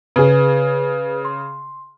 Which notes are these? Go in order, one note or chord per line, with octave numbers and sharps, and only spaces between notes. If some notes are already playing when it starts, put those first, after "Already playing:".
C#3 G#4 B4
C6